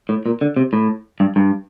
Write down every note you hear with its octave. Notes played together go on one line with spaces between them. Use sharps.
A2
A#2
D3
C3
A2
G2
G2